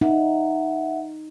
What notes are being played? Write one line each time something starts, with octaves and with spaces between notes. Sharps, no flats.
D#4 E5 F#5